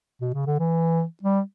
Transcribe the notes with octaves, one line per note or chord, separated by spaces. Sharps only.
B2
C#3
D3
E3
G3